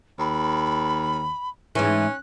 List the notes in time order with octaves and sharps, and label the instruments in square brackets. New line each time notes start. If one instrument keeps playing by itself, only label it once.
[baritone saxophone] D#2 [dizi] B5
[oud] G#2 E3 [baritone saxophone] C#4 [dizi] F#6